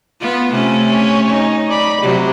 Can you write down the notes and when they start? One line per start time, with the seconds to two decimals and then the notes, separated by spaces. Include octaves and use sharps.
0.21 B3 F4
0.50 C3 A3 C#4
0.90 C#5 G#5
1.30 D#4
1.69 D5 B5
2.02 C3 F#3 G4